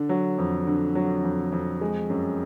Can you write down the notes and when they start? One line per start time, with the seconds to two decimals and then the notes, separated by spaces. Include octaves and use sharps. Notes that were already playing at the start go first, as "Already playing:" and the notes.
Already playing: D3 D4
0.09 F#3
0.38 F2
0.67 D3
0.95 F#3
1.24 F2
1.52 F2
1.81 G#3
2.10 F#2